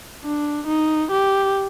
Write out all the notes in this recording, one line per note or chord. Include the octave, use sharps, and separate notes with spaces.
D4
D#4
G4